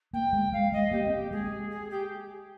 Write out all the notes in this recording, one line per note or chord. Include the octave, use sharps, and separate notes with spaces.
A#3 G5
G#3
G#3 F5
G#3 D#5
A#3 G4
C4
A#3
G#3 G#4
G#4
G4